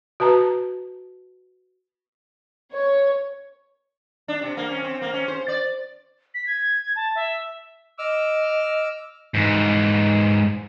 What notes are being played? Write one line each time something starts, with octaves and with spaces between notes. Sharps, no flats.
F#4 B4 A5 A#5
C#5
D4
C3
A#3
C#4
C4
A#3
C#4
C5
D5
B6
G#6
A5
E5
D#5 D6 E6 F6
G#2 E3